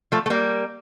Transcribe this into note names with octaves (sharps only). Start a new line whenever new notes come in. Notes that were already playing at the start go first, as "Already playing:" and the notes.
F3 A3
A3
G3 A#3